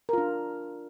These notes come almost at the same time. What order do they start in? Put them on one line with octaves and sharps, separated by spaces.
A#4 F4 D4